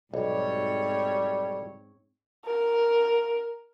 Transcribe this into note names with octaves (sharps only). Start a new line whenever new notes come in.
B1 G#2 G3 C4 C#5
A#4